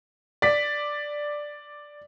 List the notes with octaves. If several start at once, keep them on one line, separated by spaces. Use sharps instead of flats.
D5 B6